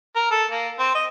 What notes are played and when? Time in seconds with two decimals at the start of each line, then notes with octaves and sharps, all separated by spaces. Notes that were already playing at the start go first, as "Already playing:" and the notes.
0.16 A#4
0.31 A4
0.51 A#3
0.79 C4
0.95 D#5